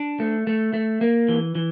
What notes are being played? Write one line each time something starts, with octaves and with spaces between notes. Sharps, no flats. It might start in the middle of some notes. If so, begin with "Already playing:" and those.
Already playing: D4
A3
A3
A3
A#3
E3
E3